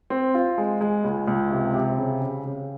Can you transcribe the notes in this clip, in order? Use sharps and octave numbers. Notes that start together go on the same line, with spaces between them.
C4
F4
G#3
G#3
C#2
C#2
C3
C3
C#3
C#3
C#3